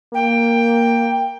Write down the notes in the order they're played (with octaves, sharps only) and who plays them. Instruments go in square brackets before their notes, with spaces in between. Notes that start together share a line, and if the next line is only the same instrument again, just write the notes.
[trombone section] A#3 [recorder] G5